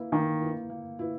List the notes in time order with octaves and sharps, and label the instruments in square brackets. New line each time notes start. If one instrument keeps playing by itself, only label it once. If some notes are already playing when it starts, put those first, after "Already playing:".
Already playing: [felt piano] A#3 E4 B4
[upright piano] D#3 [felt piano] A#3
[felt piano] E4 B4
A#3
E4 B4